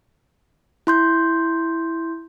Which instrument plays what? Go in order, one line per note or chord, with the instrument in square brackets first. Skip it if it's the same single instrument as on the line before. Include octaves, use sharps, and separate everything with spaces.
[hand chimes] E4 C6 G6